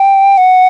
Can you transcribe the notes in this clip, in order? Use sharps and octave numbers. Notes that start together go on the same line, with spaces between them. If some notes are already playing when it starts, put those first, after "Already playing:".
Already playing: G5
F#5